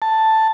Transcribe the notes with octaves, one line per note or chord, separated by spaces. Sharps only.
A5